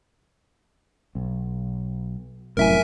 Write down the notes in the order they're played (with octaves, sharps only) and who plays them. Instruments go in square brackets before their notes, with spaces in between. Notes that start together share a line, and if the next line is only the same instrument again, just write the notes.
[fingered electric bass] B1
[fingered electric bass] F1 F#2 A2 [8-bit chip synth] A#4 E5 G#5